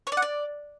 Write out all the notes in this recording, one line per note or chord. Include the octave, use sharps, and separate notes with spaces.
C#5
D5
F#5
D5